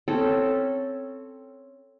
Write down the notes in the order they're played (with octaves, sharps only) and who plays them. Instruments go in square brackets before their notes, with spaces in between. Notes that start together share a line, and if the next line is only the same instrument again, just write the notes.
[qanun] C4 C#4 A4